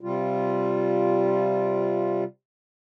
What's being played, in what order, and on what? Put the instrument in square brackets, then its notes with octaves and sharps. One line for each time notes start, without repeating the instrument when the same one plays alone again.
[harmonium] C3 G3 F4